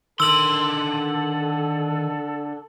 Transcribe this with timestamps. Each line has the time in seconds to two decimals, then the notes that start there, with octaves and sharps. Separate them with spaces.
0.20 D3 D#3 A4 C6 E6 F#7